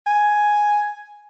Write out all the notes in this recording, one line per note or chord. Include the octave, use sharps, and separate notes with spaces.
G#5